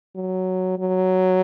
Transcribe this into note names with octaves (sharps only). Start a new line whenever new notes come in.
F#3
F#3